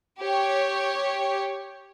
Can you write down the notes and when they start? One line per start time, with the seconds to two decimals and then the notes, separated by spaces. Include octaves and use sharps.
0.20 G4 C#5